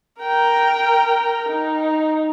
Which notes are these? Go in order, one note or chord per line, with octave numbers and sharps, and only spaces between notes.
A#4 G5
D#4